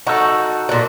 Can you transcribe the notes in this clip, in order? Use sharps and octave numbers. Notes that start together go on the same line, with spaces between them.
D#4 F#4 A4
A#2 F#4